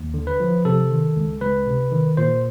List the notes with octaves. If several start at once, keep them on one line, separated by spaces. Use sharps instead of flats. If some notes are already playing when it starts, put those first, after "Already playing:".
Already playing: D#2
D3
B4
F3
C3 A4
D#3
C#2
C#2 B4
C3
D#3
A#2 C5